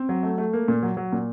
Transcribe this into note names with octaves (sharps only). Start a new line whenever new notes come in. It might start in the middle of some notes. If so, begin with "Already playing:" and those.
Already playing: C4
F#3
A3
A3
A#3
A#2
F#3
F#3
A#2